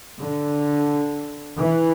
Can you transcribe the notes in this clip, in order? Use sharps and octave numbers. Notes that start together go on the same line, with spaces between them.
D3
E3